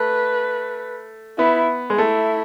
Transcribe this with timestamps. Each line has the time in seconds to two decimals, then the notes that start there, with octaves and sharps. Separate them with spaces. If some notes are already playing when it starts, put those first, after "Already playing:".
Already playing: A3 B4
1.38 B3 E4
1.90 G#3
1.98 A3 E4